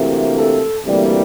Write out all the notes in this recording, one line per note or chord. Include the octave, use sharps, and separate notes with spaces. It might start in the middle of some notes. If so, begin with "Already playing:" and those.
Already playing: D2 C3 E3 A#3
A4
D2 C3 E3 G3 A#3